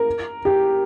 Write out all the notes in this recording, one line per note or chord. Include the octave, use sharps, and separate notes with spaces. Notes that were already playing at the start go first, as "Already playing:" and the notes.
Already playing: A#4
G4